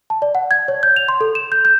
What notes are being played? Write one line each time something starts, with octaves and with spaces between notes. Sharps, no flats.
A5
D5
F#5
G#6
C#5
G6
F7
C6
A4
E7
G6
G6